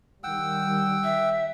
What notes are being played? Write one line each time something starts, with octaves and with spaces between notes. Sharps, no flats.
D#3 G3 F#5 G5 E6
E5